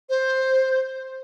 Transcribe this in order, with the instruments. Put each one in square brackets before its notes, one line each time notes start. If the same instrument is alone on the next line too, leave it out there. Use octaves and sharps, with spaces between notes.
[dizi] C5